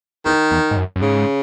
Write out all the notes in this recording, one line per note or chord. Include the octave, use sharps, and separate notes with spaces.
E2 D#3
E2
G#2
F#2
F#2
G#2 C#3